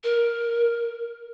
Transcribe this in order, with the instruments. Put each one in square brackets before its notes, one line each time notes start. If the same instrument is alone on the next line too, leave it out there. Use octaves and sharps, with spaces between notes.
[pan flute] A#4